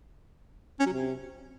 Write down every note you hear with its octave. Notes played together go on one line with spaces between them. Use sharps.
C#4
F#3
C3